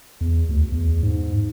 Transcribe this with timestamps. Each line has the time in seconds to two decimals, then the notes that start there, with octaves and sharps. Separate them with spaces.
0.21 E2
0.49 D2
0.72 E2
1.03 G#2